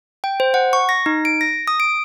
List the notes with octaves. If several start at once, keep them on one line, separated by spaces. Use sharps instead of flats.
G5
C5
F#5
C#6
A#6
D#4
D7
A#6
D#6
D7